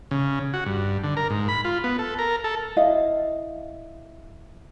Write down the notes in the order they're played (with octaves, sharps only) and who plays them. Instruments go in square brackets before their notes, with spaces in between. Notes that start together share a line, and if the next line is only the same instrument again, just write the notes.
[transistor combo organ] C#3
F#4
G2
D3
A#4
G#2
B5
F4
B3
A4
A#4
A4
[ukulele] E4 D#5 F5